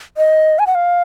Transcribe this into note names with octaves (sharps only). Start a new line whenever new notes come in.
D#5
G#5
F#5
F5